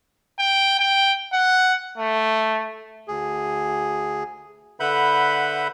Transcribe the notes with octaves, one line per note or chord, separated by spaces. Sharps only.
G5
G5
F#5
A3
D2 G#4
D3 B4 E5 F#5 B5 G6